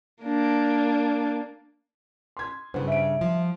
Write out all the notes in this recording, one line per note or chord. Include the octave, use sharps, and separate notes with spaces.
A#3 D4
C6 G#6
G2 C#3 B4 C5 F#5
E5 D7
F3